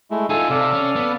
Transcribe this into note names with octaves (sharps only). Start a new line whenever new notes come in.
G#3 A3 E4
D#4 F4 A4 G#5
C3 A4 D5 F5
C#4
B3